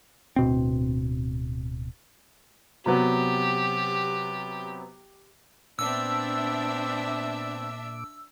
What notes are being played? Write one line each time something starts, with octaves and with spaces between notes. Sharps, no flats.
D1 B2 C4
C3 F#3 B3 G4
A#2 B3 C4 D4 E5 D6 E6